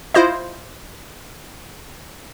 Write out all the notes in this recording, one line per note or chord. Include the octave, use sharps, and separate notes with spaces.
E4 F4 C5 D#5